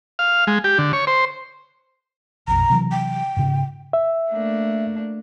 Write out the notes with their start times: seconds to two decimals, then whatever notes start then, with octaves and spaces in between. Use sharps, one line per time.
0.19 F5
0.47 G#3
0.64 G4
0.78 D3
0.93 C#5
1.07 C5
2.48 A#1 F2 B2 A#5
2.70 C3 E3 F#3
2.92 G5
3.37 G#2 C#3
3.93 E5
4.29 A3 A#3 D4